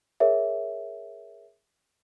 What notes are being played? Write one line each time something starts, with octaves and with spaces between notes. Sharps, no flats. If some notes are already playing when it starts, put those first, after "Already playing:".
G#4 A#4 C#5 E5